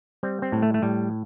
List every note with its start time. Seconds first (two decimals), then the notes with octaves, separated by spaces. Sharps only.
0.23 G3 C4
0.42 C4
0.52 A2
0.62 A3
0.74 A3
0.82 A2 G3